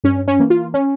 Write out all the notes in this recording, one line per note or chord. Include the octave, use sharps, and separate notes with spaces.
G2 C#4
C#4
E3 A#3
F4
C#4